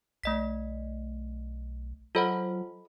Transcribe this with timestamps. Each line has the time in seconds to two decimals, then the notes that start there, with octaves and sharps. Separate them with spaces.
0.24 B1 A3 D#5 B6
2.15 F#3 F4 A4 C5 D#5 F#5 B5